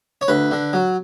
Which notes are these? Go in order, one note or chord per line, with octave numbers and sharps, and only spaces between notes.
C#5
D2 B4
D3
F#3